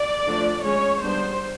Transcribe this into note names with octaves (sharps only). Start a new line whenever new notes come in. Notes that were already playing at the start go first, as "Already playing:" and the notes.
Already playing: D5
D3 F3 A3 D4
G#3 C#4 C#5
G3 B3 D4 C5